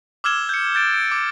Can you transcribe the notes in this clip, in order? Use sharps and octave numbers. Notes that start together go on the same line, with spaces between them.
D6 E6 F6 G#6 E7 G7
G6 C#7
G6 A6 D7
D7
D6